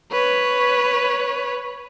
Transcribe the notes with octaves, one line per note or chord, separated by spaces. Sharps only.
B4 C#5